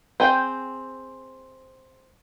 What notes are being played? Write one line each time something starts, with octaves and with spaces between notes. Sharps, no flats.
C4 G#4 G5